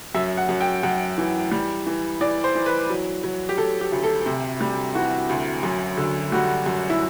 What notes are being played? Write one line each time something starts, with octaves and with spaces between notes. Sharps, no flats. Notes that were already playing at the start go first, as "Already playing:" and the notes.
F#2 E5
F#5
F#2
G5
F#2 F#5
E3
G3
E3
E3 D5
C5
E3
B4
F#3
F#3
G4
F#3 A4
G4
D2
A4
C3
G3
E3 F#4
D2
F#2
D3
G3 F#4
F#2
E4